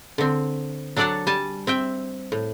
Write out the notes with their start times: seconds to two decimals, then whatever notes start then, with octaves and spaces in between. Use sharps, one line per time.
0.18 D3 C4
0.96 F#3 D4 A4 D5 F#5 A5
1.27 G3 G#5 A5
1.67 C4 E5 G5
2.32 A2